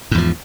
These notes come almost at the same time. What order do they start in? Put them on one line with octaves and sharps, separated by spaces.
G#2 E2 F3